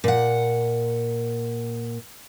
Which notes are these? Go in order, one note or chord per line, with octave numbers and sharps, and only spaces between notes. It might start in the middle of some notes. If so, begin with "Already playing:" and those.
A#2 F#5